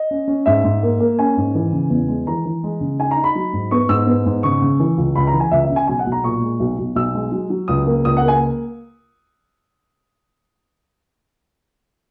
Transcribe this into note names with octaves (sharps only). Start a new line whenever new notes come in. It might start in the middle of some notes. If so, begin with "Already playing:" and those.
Already playing: D#5
C#4
C#4
G#2 E5
G#2
A#3
A#3
C#4 G#5
G#2
E3
C#3
E2
G#3
E3 A#5
E3
G#3
C#3
D#4 G#5
A#5
D#4
B5
F#3
G#2
B3 C#6
G#2 E6
B3
G#2
C#3 C#6
C#3
E3
C#2
C#2 B5
A#5
E3
G#5
C#2 E5
E5
C#3
G#5
B1 G#5
F#5
B1
A#5
A#2 C#6
G#3
B1
B1
B1 E6
G#3
F#3
F#3
C#2 D#6
A#3
C#2 D#6
F#5
A#3
G#5